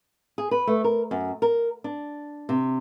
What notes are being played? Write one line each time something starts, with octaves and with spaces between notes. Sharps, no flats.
G#4
B4
A3
A#4
F#2
A#4
D4
C3